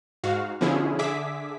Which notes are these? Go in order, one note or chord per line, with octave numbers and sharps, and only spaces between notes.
G#2 F#4 F5
B2 D3 F3 C#4 E4 G#4
D3 G#4 E5 D6 B6